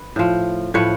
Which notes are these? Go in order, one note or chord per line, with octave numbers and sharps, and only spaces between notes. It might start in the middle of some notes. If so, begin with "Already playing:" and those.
Already playing: B4
A2 F3
A2 F3 B4 C#5